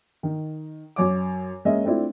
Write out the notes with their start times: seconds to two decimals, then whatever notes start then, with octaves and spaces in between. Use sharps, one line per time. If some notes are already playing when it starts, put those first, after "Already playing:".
0.23 D#3
0.96 F#2 C#5 D6
1.65 G#3 A#3 C#4 D#5 E5
1.84 A3 C4 D4 E4 F4